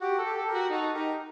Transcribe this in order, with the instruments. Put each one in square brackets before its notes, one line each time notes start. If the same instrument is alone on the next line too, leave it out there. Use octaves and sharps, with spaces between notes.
[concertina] F#4 [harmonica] G4
[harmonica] A4
[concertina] G4
[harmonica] A4
[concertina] G4 A#4
[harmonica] F#4
[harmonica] D#4 [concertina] F#4 A4
[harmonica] D#4 [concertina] G4 A#4